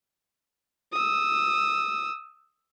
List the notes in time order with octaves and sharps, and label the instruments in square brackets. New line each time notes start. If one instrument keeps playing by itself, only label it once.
[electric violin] D#6 E6